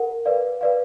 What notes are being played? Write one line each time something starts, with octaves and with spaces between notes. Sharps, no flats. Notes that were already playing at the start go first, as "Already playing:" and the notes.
Already playing: A#4 F#5
B4 D5 F5
B4 D5 F5